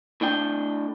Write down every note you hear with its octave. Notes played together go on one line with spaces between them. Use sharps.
A2 A3 D4 G5